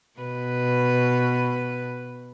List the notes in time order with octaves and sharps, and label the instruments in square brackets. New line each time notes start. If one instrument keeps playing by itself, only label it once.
[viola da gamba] B2 B4